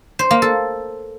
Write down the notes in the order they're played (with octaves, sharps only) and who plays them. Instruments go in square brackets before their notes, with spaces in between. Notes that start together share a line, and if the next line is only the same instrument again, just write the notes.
[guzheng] C5
A#3
A4